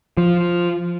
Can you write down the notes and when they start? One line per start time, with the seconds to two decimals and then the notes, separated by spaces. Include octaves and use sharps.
0.17 F3